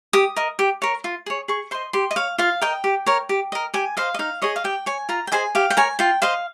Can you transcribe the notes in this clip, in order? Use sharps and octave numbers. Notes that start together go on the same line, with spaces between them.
G4 D#6
A#4 D#5
G4
A#4 C#5
F4
G#4 C#5
G#4 C#6
C5 D#5 C6
G4 C6
D#5
C#5 F5
F4 F5
A#4 D#5 G5
G4
A#4 C#5
G4
A#4 D#5
G4 G#5
C5 D#5 F5
D#5
D#4 F5
G#4 C#5 D#5
F5
G4 G5
C#5 G#5
F4 A#5
G5
G#4 C5 D#5 G#5
G4 F5
G5
A#4 C#5 G#5
F4 G5
C5 D#5 F5